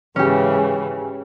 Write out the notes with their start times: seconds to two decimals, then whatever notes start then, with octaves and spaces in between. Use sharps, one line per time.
0.16 G#2 C#3 E3 C#4 G4